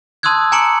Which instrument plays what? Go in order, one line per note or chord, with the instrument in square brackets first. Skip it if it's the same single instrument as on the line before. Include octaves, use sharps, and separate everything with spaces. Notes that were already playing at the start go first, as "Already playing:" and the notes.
[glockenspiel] A5 C6 D#6 E6 F#6 G#6
G#5 A#5 D6 C#7 D7 F#7